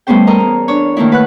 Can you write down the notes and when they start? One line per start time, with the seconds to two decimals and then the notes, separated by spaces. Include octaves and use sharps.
0.07 G3 A3 B3 C#4 C5 G5
0.27 A4 A#4 D#5 A#5
0.40 E2
0.68 D4 C#5
0.97 D#3 A3 A#3 D#4 E4
1.12 B4 F#5 F#6